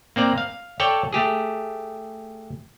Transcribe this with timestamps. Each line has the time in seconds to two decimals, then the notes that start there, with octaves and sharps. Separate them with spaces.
0.16 A#3 C4 D5 A#5
0.38 F5
0.80 A4 C#5 D5 G5 A5
1.13 A3 G4 G#4